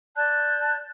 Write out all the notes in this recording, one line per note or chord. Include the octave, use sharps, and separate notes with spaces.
D5 A5 F#6 G6